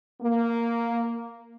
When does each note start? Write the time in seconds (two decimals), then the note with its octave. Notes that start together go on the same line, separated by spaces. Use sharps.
0.22 A#3